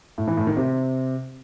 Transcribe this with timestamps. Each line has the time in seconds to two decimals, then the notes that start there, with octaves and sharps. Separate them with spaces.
0.18 A2
0.28 E3
0.37 A2
0.47 D#3
0.57 C3